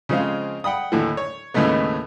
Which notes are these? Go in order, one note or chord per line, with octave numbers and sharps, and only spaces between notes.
C#3 F3 G#3 C4 F5
F#5 G5 B5 D#6
D#2 A2 D3 E3
C#5
D#2 A2 C#3 G#3 A3 B3